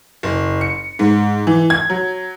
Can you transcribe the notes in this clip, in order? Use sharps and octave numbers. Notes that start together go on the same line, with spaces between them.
F#1
C#7
G#2
E3
G#6
F#3